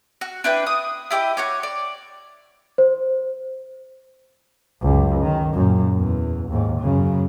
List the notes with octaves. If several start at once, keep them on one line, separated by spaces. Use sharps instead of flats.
F#4
D4 E4 B4 G5
D#6
E4 G4 D5 D#5
F#4 C#5 D6
D5
C5
C#2 F#2
D#3
F#2 A#2
E2
D#2 G#2
F#2 C#3